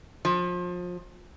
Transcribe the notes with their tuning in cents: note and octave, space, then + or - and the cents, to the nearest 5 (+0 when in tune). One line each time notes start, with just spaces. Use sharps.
F3 +30